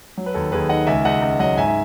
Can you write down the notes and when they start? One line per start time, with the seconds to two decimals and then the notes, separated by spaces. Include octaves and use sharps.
0.17 F#3
0.26 B4
0.34 D#2 A4
0.52 D#2 G#4 B4
0.69 D#3 D#5 F#5
0.87 C#2 E5 G#5
1.05 C#2 D#5 F#5
1.22 C#2
1.39 F#3 D#5 F#5
1.57 G#2 E5 G#5
1.68 E5